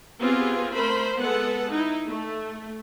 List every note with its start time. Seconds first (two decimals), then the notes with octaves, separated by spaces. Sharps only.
0.20 B3 C4 F4 G4 G#4
0.74 A3 A#4 C5 B5
1.19 G#3 B3 A4 F#5
1.70 D#4 E4
2.07 A3